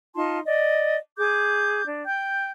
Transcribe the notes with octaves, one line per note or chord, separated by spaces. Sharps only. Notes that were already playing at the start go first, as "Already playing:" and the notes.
D#4 F4 A5 C6
D5 D#5
G#4 D6 G6
D4
G5 G6